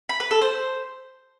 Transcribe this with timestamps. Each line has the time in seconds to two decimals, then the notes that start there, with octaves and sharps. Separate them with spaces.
0.09 B5
0.20 B4
0.31 A4
0.42 C5